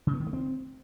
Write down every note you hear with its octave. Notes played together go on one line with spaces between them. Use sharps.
C#3
B3
D#3
A3
C4